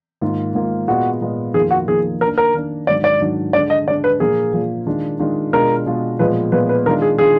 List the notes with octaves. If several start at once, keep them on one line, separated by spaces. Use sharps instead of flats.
G#2 D#3 A#3 F4
G#2 D#3 A#3 F4
A#2 G#3 B3 F4 F#4
A#2 G#3 B3 F4
F2 D#3 A#3 F4 G#4
F#4
F2 D#3 A#3 F4 G#4
D#3 A#3 D4 A#4
A#4
D#3 A#3 D4
G#2 D#3 F#3 D4 D5
D5
G#2 D#3 F#3 D4
D3 G#3 D4 D5
D#5
D3 G#3 D4 D5
B4
A#2 F3 A#3 G#4
A#2 F3 A#3
D#3 G#3 D4 F4
D#3 G#3 D4 F4
B2 G#3 D4 F4 A#4
B2 G#3 D4 F4
A#2 F3 G#3 B3 B4
A#2 F3 G#3 B3 B4
B4
D#3 G#3 D4 F4 A#4
G#4
D#3 G#3 D4 F4 G#4